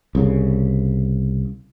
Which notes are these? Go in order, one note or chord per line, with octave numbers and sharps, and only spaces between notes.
C2 C#3